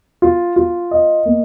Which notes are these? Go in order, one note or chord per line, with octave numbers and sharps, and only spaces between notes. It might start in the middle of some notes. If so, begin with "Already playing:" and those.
F4
F4
D#5
A#3